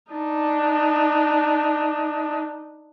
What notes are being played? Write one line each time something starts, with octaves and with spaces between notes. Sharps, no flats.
D4 D#4